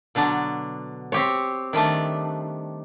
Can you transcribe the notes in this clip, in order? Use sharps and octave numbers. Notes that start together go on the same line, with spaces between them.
B2 D3 F#3 D4
C4 G4 C#5
D#3 G3 A3 D4